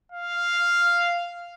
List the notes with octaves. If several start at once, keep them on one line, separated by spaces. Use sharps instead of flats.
F5